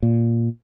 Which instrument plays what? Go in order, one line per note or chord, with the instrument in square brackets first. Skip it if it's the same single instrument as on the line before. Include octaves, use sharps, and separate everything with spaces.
[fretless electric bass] A#2